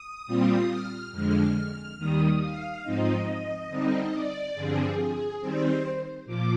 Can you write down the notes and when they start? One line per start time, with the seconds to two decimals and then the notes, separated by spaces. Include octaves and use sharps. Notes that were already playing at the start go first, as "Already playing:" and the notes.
Already playing: D#6
0.27 A#2 G3 C4 F4
0.69 F6
1.11 F2 D3 G#3 F6
1.98 D#2 D#3 G3 D#6
2.40 F5
2.83 G#2 F3 C4 D#4 D#5
3.69 D3 G3 C4 D#4
4.12 D5
4.54 G2 D3 F3 C4 G#4
4.97 G#4
5.40 D#3 G3 C4 C5
6.26 A#2 F3 D6